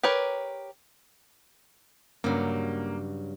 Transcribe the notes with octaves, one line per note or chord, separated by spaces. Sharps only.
G4 A#4 B4 C#5
G2 C#3 F#3 A#3